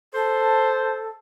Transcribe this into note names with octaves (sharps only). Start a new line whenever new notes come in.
A4 C5